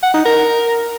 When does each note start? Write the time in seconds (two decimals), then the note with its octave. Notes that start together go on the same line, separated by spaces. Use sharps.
0.03 F#5
0.14 D#4
0.25 A#4